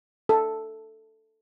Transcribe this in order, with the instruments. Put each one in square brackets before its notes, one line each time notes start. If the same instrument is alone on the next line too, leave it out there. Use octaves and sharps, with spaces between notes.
[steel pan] A4